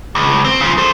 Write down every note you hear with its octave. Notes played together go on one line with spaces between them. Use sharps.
C#2
C4
C#3 F3
A4 C5